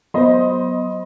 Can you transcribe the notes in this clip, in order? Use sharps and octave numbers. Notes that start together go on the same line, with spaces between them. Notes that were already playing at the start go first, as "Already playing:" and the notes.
F#3 B3 C5 D#5 B5 C6